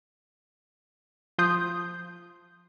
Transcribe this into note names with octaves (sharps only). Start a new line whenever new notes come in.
F3 C6 D#6 G6